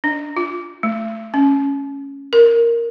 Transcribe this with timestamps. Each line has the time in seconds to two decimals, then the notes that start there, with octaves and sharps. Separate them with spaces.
0.04 D4
0.37 F4
0.83 A3
1.34 C#4
2.33 A#4